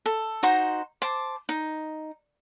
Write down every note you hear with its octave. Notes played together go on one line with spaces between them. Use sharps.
A4
D#4 F#4 C5 A#5
C5 A5 D6
D#4